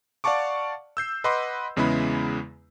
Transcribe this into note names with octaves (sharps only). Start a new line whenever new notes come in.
D5 F5 F#5 A5 C#6 D6
E6 G6 C7
B4 D#5 F#5 B5 C6 D6
E2 C#3 G#3 B3 E4 B5